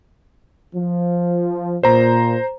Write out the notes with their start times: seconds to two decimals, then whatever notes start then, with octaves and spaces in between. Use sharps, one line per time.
0.76 F3
1.83 A#2 C5 A#5